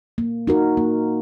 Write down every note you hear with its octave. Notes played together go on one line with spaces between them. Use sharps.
A#3
D#4 F#4 A#4
A#3